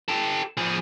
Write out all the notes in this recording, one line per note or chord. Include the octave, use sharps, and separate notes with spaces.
G4 A4
F3 G#4